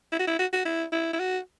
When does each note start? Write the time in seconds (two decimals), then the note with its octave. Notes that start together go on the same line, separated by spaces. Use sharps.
0.12 E4
0.20 F#4
0.27 E4
0.39 F#4
0.53 F#4
0.65 E4
0.92 E4
1.13 E4
1.20 F#4